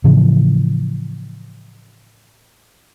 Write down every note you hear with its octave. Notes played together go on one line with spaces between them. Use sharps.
A2 C#3 E3 F3